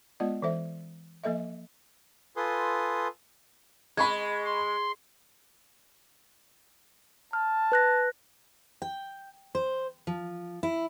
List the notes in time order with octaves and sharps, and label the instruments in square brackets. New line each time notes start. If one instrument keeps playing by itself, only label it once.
[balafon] G#3 B3 F4 D5 D#5
E3 A4 C5 E5
F3 A#3 A4 D#5 E5
[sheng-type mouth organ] F4 A4 B4 G#5 C6 D#6
[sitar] G#3 [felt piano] B5 C#6 G#6
[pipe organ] C6
[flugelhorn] A5 [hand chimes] F6
[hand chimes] B4 F#6 A#6
[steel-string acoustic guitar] G5
C5
F3
E4